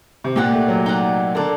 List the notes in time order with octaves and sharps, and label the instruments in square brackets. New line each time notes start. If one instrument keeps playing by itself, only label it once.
[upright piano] C3
[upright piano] A#2 [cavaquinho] D#4 G4 D5 F#5
[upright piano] A3
F#3
[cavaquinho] D#4 G4 D5 F#5
[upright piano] D3 [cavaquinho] A#4 D5 A5